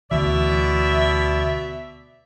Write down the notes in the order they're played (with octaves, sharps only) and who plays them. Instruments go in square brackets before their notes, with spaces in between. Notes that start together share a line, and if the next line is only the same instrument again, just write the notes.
[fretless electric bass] D2 E3 [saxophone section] B2 D5 E5